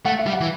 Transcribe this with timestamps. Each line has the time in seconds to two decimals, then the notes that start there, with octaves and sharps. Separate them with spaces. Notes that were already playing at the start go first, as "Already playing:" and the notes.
0.05 A3 F#5
0.19 E5
0.26 G3
0.33 F#5
0.41 E3